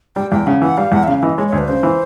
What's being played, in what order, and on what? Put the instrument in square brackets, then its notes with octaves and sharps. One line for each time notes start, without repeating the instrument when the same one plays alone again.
[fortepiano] G3 [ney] G5
[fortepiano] E2 [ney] G5
[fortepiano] C#3 [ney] F#5
[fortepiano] E3 [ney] F#5
[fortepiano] G3 [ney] F5
[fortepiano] E2 [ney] F#5
[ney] E5
[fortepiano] C#3 [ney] F5
[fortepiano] E3 [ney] D#5
[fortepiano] G#3 [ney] C#5
[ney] C#5
[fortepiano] D2
[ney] B4
[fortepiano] C#3 [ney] C5
[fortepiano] E3